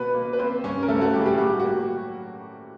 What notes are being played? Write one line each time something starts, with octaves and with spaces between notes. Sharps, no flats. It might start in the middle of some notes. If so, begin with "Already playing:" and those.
Already playing: B2 A#3 B3 B4
A#3
B4
A#3 C4 C5
G2 C#4 C#5
A#4
G2 A3 A4
F#4
G2 G3 G4
G#4
G3 G4
A2 F#4
G4
A#3 F#4
F#3